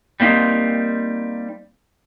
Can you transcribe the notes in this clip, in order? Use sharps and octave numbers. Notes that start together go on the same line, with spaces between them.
G3 A#3 C4 D#4